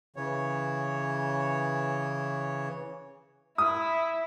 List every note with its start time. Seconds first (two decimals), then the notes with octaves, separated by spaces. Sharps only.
0.16 C#3 E3 C#5
3.58 E4 D#6